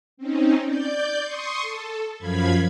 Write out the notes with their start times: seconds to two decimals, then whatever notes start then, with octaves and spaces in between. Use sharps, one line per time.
0.17 C4 C#4 D#4
0.66 D5 G6
1.22 C6 C#6 D#6
1.60 A4
2.18 F#2 F3 F4 B5 G#6